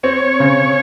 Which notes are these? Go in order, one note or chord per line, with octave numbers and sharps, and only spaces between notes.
C4 C#5
C#3